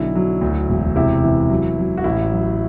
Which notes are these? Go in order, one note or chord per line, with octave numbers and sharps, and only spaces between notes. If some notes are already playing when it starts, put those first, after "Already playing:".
Already playing: B1 D3 E4
F#3
D2
E1
C3 E4
E3
F#3
F#3
F#4
A1 E4
F#3